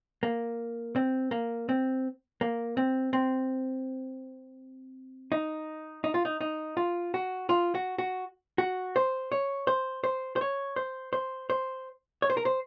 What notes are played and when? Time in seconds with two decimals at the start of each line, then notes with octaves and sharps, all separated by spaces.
0.23 A#3
0.96 C4
1.31 A#3
1.69 C4
2.41 A#3
2.77 C4
3.13 C4
5.32 D#4
6.04 D#4
6.14 F4
6.25 D#4
6.41 D#4
6.77 F4
7.14 F#4
7.49 F4
7.75 F#4
7.98 F#4
8.58 F#4
8.96 C5
9.32 C#5
9.67 C5
10.04 C5
10.36 C5
10.41 C#5
10.76 C5
11.13 C5
11.50 C5
12.22 C#5
12.30 C5
12.37 A#4
12.45 C5